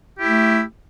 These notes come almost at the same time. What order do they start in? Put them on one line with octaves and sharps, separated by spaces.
G4 E4 A3